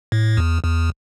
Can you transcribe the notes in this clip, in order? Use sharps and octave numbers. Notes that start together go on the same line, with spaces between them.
A2
E2
E2